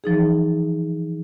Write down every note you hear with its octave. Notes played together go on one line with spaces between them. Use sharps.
E3 F3 D#4 G#4